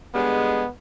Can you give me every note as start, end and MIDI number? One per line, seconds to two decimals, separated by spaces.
0.14 0.64 50
0.14 0.64 55
0.14 0.64 56
0.14 0.69 59